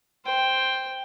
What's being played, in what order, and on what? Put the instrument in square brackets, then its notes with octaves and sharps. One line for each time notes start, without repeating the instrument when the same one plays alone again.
[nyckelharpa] C5 G5